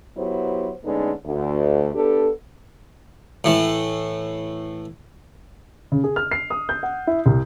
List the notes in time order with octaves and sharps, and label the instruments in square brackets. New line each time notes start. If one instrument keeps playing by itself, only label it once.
[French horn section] F#3 B3 E4 G4 C5
D3 G#3 A3 B3 C#4 D#4
D2
B3 D4 G4 A4
[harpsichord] A2 E3
[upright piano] C#3
G#4
F6
C7
D#6
G6
F#5
E4
C2